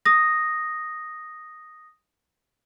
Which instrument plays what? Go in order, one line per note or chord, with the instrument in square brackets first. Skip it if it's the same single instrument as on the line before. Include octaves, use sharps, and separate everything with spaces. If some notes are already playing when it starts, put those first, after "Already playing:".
[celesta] D#6 A#6